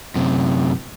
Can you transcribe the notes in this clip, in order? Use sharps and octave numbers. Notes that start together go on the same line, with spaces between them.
F#2 C3